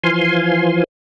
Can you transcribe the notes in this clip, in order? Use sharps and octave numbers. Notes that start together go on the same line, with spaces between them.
E3 F3 F5 G#5 C6